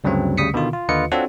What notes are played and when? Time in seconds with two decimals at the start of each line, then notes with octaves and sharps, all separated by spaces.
0.04 D2 G2 C#3 F#3 C4
0.38 D2 C#3 G3 D#6 B6 C#7
0.54 B2 D3 D#3 F4
0.73 F4
0.89 D#2 D3 F4 B4 D#5 C#7
1.12 C4 D4 F4 F#4 A4 C#5